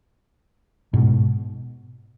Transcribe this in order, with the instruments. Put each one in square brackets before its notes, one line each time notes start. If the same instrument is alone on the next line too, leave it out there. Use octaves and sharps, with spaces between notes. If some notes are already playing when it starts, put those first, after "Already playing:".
[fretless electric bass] G#2 B2